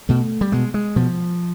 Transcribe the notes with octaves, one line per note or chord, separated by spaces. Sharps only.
B2 A3
G3
B2 G#3
G#3
B2 F3